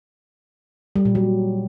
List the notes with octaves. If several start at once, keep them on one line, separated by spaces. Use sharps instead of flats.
G3
A#2
F#3